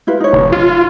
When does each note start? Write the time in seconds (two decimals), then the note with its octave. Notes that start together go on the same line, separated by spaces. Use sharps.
0.07 E4 F4 B4
0.20 D#4 C#5
0.33 F1
0.52 F4